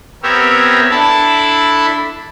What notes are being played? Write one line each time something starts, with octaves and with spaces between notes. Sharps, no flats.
B3 C4 G4 A#4 C#5 E5
D4 E4 A4 A5 B5